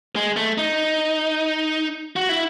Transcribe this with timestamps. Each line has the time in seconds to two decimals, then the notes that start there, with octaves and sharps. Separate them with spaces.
0.16 G#3
0.37 A3
0.58 D#4
2.16 F#4
2.29 E4